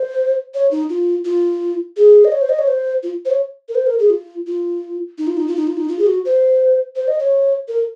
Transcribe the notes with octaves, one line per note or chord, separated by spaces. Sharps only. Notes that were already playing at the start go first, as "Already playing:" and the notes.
Already playing: C5
C#5
D#4
F4
F4
G#4
D#5
C#5
C5
D#5
C#5
C5
F4
C5
C#5
A#4
C5
A#4
G#4
F4
F4
D#4
F4
D#4
F4
D#4
F4
D#4
F4
G#4
F#4
C5
C5
D#5
C#5
A#4